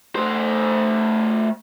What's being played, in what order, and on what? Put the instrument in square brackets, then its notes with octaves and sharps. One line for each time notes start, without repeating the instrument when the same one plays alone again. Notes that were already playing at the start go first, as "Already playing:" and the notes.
[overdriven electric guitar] A3 C5